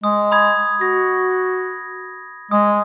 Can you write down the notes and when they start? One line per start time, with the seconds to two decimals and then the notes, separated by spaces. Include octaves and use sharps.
0.04 G#3 D#6
0.32 B5 D#6 G#6
0.81 F#4 A#6
2.51 G#3 D#6